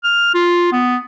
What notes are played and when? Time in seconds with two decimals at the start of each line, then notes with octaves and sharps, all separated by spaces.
0.04 F6
0.34 F4
0.72 B3